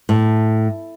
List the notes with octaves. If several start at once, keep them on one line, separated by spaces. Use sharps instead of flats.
A2